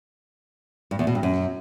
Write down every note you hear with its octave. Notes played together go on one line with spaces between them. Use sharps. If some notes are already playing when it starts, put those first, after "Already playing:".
G2
E2
B2
G2
F#2